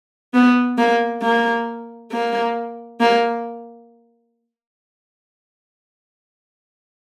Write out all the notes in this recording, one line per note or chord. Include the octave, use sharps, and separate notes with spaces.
B3
A#3
A#3
A#3
A#3